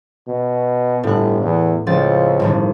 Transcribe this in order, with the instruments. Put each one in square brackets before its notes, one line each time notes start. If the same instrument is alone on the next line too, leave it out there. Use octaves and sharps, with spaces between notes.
[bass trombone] B2
[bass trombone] G1 [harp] A2 F#6
[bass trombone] E2
[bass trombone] C#2 [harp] F3 C4 A6
[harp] G1 A2 D#3